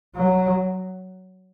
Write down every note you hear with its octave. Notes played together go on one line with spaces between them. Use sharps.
F#3